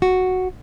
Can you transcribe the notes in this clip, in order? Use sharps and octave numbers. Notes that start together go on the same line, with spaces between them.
F#4